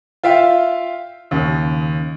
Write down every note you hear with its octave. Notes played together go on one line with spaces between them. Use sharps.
F4 E5 F5 G5
D#2 C#3